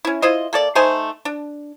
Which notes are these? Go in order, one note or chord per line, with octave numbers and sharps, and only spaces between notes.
C#4 E4
E4 F4 C5 D#5
A#3 A4 D5
A3 D#4 C5 G#5
D4